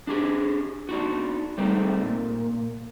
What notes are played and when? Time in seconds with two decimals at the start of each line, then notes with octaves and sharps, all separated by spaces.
0.07 D4 G4 G#4
0.89 D4 D#4 F#4
1.58 G3 A3 C4 D#4 G#4
2.02 A#2